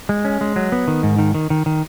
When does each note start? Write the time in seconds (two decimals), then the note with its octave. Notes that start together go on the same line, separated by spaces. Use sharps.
0.09 G#3
0.25 C#4
0.41 G#3
0.56 F#3
0.72 B3
0.88 D#3
1.03 G#2
1.19 D#3
1.34 D#3
1.50 D#3
1.66 D#3